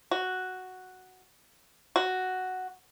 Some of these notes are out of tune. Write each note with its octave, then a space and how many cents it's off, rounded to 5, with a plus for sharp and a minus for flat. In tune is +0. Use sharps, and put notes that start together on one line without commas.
F#4 +0
F#4 +5